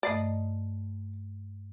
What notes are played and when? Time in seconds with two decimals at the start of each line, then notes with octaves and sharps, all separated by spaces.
0.03 G2 A3 D5 D#5 A#5